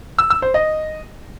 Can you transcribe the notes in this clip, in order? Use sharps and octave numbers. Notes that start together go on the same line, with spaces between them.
E6
E6
C5
D#5